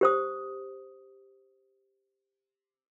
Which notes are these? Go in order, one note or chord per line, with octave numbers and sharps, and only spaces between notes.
G4 C5 D#6